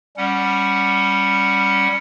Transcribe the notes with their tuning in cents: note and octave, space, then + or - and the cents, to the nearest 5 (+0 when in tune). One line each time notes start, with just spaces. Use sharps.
G3 +0 C#4 +0 F#5 +0